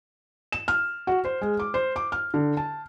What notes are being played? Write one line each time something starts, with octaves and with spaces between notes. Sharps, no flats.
E7
F6
F#4
C5
G#3
D6
C5
D6
F6
D3
A5